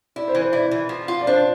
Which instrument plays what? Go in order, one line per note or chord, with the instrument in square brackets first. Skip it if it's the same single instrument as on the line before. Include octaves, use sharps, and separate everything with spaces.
[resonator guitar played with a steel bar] E4 [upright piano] D5
[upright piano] C5
[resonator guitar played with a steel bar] E3
[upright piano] C5
[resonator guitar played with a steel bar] E4 [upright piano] D5
[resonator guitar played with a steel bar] E3
F3
F4
[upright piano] D5
[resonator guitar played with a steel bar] D4 [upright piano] C5